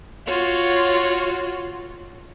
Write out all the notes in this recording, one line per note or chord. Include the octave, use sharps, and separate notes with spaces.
F4 F#4 C#5